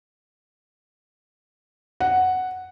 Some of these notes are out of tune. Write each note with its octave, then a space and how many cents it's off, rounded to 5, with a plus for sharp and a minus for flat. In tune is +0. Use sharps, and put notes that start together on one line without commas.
F#5 +0